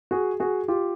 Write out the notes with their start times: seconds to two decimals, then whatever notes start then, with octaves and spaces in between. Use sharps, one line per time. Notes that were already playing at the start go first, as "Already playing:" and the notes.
0.11 F#4 G#4
0.40 F#4 G#4
0.68 F4 G4